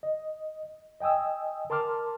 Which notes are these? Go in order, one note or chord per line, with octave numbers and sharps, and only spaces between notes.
D#5
D#5 G5 G#5 D#6 E6
A#4 A5 C6 D6 F6